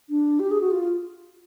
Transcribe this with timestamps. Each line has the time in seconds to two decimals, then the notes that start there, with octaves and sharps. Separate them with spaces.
0.10 D4
0.40 G4
0.51 G#4
0.61 F#4
0.71 F4